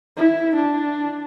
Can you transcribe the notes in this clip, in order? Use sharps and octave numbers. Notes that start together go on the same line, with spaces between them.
E4
D4